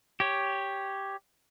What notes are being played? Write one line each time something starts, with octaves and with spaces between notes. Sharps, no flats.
G4 C#5